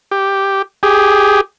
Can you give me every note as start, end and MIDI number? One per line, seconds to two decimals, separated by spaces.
0.11 0.62 67
0.83 1.41 67
0.83 1.41 68